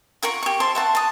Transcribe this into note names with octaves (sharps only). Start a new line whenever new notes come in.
F4 A#4 F#5 C#6
G4 C#6
C5 E5 A5 C6
E5 F#5 A5
A5 D#6